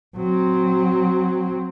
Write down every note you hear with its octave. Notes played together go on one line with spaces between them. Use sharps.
F#3 C4